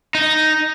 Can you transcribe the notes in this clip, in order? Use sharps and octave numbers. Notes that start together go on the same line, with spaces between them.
D#4